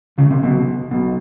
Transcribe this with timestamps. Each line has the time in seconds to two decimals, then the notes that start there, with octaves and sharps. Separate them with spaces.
0.18 C#2 C#3
0.30 C2 C3
0.42 B1 B2
0.91 B1 B2